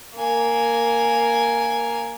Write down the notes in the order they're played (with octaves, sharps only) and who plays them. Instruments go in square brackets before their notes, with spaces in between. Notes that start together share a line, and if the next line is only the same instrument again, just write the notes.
[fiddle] A#3 G#5